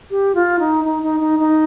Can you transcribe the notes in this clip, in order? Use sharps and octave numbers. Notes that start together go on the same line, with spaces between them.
G4
F4
D#4
D#4
D#4
D#4
D#4